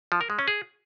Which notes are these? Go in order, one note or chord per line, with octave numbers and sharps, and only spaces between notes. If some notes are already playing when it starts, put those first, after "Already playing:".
F3
A#4
G#3
C#4
G#4